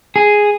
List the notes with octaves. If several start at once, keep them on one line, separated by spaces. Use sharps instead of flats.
G#4